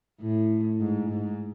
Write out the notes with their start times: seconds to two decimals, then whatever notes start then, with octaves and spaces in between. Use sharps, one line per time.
0.20 A2
0.80 G#2
1.10 G#2